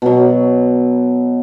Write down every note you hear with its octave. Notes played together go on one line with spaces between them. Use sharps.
B2 F#3